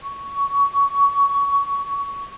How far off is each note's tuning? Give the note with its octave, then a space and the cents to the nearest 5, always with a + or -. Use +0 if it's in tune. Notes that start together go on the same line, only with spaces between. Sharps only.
C#6 +15